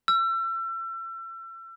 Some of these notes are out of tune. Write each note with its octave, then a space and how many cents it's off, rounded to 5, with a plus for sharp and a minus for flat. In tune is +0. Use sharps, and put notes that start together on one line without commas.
E6 +35